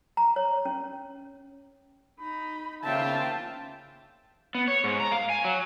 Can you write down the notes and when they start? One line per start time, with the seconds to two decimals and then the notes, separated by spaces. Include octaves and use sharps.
0.17 A#5
0.36 C#5
0.65 C#4
2.20 D#4 B5
2.84 C#3 A#3 F4 C5 E5 G5 A5
4.55 B3
4.68 C#5
4.84 G#2
5.00 A#5
5.12 F5
5.30 G#5
5.45 F#3